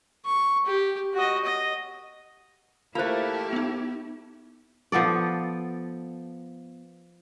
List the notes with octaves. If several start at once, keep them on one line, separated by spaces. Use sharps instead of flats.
C#6
G4
F#4 D#5
D#5
A3 A#3 E4 F4 G4 C5
B3 D#4
F3 B3 A4 D5